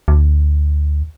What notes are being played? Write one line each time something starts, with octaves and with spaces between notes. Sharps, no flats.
D2